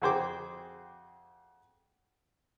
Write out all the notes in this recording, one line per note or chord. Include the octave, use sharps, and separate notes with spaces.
F2 F#4 G#4 C5 G5 D6